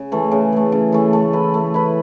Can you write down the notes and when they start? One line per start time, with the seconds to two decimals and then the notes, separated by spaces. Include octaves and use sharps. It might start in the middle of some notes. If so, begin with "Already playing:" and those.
Already playing: C#3
0.12 E3 A3
0.31 C#3
0.52 E3 A3
0.72 C#3
0.92 E3 A3
1.13 A3
1.33 E4 B4
1.54 A3
1.74 E4 B4